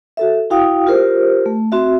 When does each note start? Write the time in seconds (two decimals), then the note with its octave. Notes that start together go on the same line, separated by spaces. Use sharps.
0.17 F#4 A4 E5
0.50 E4 F#4 F5 G5 D#6
0.87 F4 G4 A#4 C5
1.46 A3
1.72 C4 F#4 E5